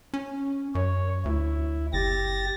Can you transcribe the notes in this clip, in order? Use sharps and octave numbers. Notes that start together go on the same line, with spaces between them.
C#4
F#2 C#5
D2 E4
F#1 G4 A6 A#6